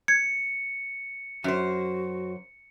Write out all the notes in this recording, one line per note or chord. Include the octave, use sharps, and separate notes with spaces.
G#6 C#7
F#2 F#4 C5